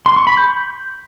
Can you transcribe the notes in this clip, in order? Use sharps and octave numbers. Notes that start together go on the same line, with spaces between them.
C6
C#6
B5
G6